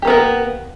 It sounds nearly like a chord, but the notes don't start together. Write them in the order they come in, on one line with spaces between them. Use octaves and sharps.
G4 A#3 B3 A#4